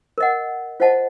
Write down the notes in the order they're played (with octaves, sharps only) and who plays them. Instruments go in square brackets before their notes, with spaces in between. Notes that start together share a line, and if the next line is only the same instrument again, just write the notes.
[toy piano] A#4 D#5 F#5
F4 C5 D#5 F#5 A5